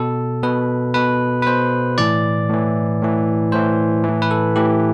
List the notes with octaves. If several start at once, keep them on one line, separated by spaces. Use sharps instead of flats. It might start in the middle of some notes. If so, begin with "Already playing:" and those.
Already playing: B2 A4
B2 B4
B2 B4
B4
B2 C5
A2 E3 D5
A2 E3
A2 E3
A2 E3 C5
A2 E3
B4
A4
A2 E3 G4